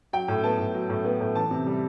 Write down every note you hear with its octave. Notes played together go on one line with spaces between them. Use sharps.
F#3 G5
A2
B3 A5
A2
F#3
A2
B3
A2
E3 A5
C3
G3